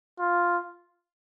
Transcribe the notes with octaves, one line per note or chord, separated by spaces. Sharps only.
F4